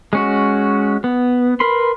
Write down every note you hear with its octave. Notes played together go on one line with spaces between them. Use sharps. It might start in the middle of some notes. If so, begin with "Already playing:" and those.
G#3 C#4 F#4
B3
A#4 B4 B5 C6